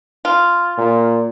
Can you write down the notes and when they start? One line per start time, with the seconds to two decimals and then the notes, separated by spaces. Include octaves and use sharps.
0.25 F4
0.78 A#2